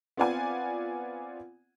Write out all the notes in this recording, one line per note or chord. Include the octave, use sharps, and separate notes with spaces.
B3 C4 F4 D5 F#5 G#5